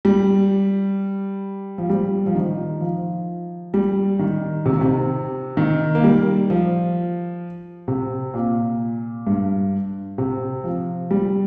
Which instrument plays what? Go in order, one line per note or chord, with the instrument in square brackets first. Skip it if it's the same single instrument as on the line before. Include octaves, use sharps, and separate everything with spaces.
[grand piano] G3
F3
G3
F3
D#3
F3
G3
D#3
C3
D#3
C3
D#3
A#3
G3
F3
C3
A#2
G2
C3
F3
G3